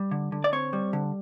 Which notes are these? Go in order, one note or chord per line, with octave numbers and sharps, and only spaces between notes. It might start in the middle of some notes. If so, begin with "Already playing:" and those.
Already playing: G3
D3
D3
D5
C4 C#5
G3
D3